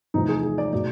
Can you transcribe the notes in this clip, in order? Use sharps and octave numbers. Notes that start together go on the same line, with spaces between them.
E2 C3 F3 A3 D#4
G#4
G#4
D5
B2 F#3 A3 D5